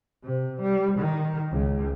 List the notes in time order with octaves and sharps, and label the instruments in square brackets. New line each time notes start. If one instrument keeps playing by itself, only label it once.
[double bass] C3
G3
D#3
C#2